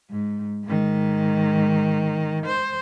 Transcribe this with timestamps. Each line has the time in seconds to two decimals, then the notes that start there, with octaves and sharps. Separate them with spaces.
0.11 G#2
0.65 G#2 D#3
2.46 C5